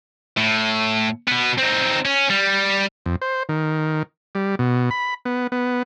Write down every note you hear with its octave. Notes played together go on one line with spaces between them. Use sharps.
A2
B2 B3
C4 D#4
C#4
G3
F2
C5
D#3
G3
B2
B5
B3
B3